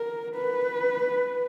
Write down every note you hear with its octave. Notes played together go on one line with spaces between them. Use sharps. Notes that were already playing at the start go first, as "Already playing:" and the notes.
Already playing: A#4
B4